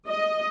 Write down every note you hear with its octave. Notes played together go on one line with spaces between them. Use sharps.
D#5